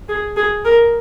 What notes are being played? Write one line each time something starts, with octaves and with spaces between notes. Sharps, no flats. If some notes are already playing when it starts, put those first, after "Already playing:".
G#4
G#4
A#4